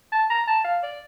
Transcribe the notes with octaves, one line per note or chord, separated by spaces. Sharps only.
A5
A#5
A5
F5
D5